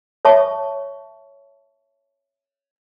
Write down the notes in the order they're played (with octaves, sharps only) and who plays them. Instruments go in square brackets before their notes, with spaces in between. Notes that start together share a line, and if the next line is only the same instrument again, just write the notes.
[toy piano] C#5 E5 A5 C#6